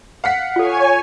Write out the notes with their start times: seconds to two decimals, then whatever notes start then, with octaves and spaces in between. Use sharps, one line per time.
0.24 F5 F#5 B6
0.56 F4 A4 C#5 G#5